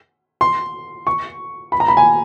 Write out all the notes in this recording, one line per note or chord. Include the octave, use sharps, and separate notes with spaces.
C6
C#6
B5
A#5
B5
G#5